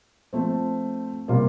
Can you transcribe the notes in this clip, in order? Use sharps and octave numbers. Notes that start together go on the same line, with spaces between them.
F3 A3 C4
C3 G3 A#3 F4